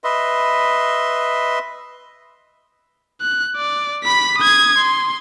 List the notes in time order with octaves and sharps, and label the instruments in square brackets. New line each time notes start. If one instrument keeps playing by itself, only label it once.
[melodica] B4 D#5 E5 C6
[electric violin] F#6
D5
B5 B6
D#6 G#6
C6